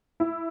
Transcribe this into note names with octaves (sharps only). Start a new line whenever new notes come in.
E4